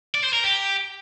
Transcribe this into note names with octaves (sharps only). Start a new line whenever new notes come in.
D5
C5
A#4
G4